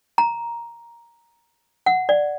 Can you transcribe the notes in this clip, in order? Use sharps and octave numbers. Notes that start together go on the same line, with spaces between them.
A#5
F#5
D5